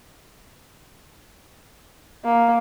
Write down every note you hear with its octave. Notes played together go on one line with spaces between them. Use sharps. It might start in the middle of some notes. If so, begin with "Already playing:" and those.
A#3